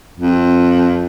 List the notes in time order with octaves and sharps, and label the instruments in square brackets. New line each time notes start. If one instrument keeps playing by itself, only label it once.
[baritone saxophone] F2